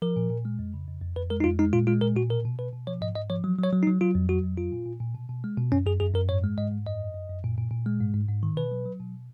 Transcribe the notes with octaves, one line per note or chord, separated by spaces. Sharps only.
F3 A#4
A#2
A#2
G#3
F2
C#3
F2
F2
F2 B4
G#3 A#4
D#4
F2 F4
G#3 D#4
A#2 F4
G#3 F4
A#2 A#4
A#2 F#4
B2 A#4
B2
B2 B4
B2
F3 C#5
G#2 D#5
G#2 D#5
F3 C#5
F#3
F#3
C#5
F#3
D#4
F#3
F#3 F4
F2
F#3 F#4
F2
F#3 F4
A#2
A#2
A#2
B2
B2
G#3
B2
F#2 C#4
F#2 G#4
F#2 G#4
F#2 A#4
G#2 C#5
G#3
G#2 D#5
G#2
F#2 D#5
F#2
F#2
F#2
A#2
A#2
A#2
G#3
G#2
G#2
G#2
D#3
B2 B4
F#3
F#3
B2